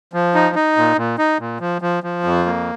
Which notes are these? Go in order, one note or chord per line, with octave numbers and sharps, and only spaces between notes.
F3
D#4
D#4
A#2
A#2
D#4
A#2
F3
F3
F3
F2
A#3